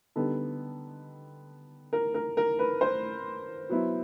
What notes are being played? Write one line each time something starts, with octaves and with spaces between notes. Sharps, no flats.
D3 G3 B3 D#4 A4
A#4
A#4
A#4
B4
C5
F#3 B3 E4